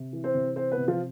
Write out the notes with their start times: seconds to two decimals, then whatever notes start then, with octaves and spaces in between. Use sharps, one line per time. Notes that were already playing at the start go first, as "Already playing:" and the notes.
Already playing: C3
0.13 E3
0.24 C4 C5
0.35 C3
0.56 E3 C4 C5
0.71 B3 B4
0.77 C3
0.88 F3 F4